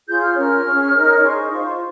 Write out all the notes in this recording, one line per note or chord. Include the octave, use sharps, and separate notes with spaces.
F4 G#4 C#5 G6
F6
C#4 F4 A#4 F6
C#4 G#4 C#5
D#4 A#4 C#5
D#4 G#4 C5 C#6
F4 C5